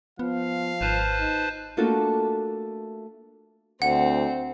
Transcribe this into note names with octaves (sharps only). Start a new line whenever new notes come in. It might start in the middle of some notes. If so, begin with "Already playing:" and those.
F3 B3 F5
G#1 B4 C5 A5
D#4
A3 A#3 D4 F4 F#4 A4
D2 C4 F#5